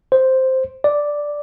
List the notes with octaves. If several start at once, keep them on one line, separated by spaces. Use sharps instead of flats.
C5
D5